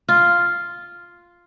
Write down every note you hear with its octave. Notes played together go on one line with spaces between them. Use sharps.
F4